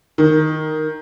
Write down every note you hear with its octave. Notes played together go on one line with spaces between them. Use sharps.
D#3